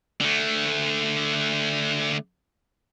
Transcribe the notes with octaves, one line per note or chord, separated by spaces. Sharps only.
D3 A3